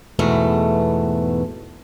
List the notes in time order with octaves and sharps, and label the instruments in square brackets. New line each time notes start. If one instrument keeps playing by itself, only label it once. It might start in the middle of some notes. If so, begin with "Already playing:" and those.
[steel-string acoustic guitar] E2 G#2 B2 A3